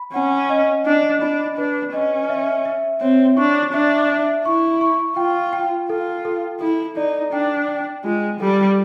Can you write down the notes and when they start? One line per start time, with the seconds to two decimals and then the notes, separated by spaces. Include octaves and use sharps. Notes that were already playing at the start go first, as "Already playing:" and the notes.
Already playing: B5
0.13 C#4 F#5
0.49 D#5
0.85 D4 D#5
1.21 D4 B5
1.57 D4 B4
1.93 C#4 D#5
2.29 E5
2.65 E5
3.01 C4 C#5
3.37 D4 C#6
3.73 D4 E5
4.09 E5
4.45 E4 C#6
4.81 C#6
5.17 F4 G5
5.53 G5
5.89 F4 A4
6.25 A4
6.60 E4 A4
6.97 D#4 D5
7.33 D4 G5
7.68 G5
8.04 G#3 F4
8.40 G3 A4